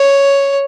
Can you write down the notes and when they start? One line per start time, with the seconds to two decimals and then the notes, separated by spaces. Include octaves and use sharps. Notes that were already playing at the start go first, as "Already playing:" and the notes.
Already playing: C#5